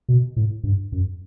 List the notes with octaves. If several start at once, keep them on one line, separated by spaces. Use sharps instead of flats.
B2
A2
G2
F#2